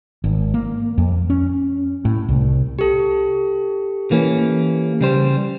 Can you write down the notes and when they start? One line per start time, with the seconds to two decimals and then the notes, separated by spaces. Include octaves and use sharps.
0.24 G#1
0.54 A#3
0.98 F2
1.30 C#4
2.05 A2
2.29 C2
2.79 G4 A4
4.11 E3 A#3 C#4
5.01 C#3 G3 C5